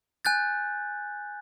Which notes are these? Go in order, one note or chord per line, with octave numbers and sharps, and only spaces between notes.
G#5 F#6 G6 A6